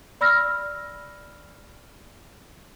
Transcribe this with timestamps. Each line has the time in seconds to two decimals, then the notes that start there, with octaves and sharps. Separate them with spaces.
0.21 D5 B5 E6 F6 A#6